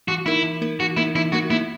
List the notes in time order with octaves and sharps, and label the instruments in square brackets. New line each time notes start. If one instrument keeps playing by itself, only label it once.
[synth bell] E3 [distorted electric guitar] F#4
[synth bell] A#3 D#4 A#4 [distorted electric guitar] E4
[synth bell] E3
A#3 D#4 A#4
[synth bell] E3 [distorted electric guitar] F#4
[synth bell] A#3 D#4 A#4 [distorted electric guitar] E4
[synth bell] E3 [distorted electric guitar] E4
[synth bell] A#3 D#4 A#4 [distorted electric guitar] F#4
[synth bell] A#3 [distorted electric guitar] E4